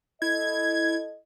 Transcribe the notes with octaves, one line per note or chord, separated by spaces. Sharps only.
E4 A4 D#5 G#6